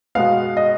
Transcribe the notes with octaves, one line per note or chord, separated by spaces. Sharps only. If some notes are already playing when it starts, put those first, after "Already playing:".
B2 G#3 B3 F5
D#5